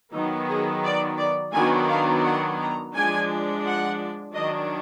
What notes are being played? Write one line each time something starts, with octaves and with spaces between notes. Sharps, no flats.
D#3 F#3 B3 D#4
G#4
D5
D5
D#3 F#3 B3 D4 G#5
F5
F#5
A#5
F3 G#3 D4 G#5
F#5
D#3 F#3 D4 D#5